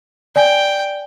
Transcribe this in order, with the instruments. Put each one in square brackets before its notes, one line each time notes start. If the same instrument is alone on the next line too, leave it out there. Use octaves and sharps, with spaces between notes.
[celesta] D5 G#5 [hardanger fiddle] G5